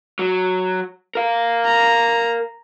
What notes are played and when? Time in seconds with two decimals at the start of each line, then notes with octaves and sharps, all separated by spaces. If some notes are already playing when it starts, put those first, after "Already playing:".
0.19 F#3
1.15 A#4 F5
1.66 A#5